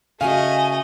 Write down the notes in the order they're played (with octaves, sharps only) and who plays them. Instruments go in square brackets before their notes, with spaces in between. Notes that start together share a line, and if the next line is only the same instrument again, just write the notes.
[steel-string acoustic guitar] C#3 F#4 [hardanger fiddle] A3 D#5 [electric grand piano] F5 [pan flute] G#5